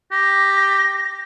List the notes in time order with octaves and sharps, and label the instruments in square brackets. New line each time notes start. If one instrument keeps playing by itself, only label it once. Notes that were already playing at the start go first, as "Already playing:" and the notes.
[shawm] G4 [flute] A#6